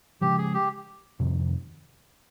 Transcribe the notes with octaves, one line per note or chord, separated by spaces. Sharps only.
C#3 F3 G#3 G4
G#4
G4
F2 C3 D#3